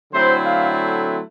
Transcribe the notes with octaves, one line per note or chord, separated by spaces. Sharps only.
D3 F#3 A3 C4 E4 C5
F5